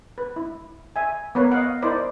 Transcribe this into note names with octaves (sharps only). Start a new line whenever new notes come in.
B4
E4
E5 G#5
B3 A#4 B4 C#5 F5
D#5 F5 F#5
D#4 E4 A#4 C5 D5